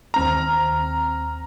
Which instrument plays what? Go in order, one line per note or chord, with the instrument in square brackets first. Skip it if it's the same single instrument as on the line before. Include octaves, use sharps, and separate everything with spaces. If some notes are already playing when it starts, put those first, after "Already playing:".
[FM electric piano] D#2 C4 F6 [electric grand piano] A#5